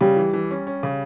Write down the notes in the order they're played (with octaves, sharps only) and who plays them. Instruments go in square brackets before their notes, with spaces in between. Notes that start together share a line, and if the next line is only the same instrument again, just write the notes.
[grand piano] C#3 [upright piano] G3
[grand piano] E3
E3
C#4
C#4
C#3